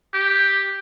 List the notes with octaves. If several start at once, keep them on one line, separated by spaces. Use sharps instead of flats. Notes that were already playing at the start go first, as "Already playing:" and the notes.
G4